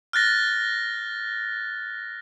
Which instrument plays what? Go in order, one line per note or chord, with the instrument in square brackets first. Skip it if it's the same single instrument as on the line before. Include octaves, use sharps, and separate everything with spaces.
[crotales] F6 F#6 A6 A#6